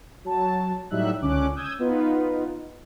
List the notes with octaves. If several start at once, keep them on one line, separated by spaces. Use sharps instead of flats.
F#3 A5
A2 F#3 G3 D#4 E5 F#6
C#2 D3 C#4 D6 F#6
D#6 E6 G6 G#6
B3 D#4 F4 B4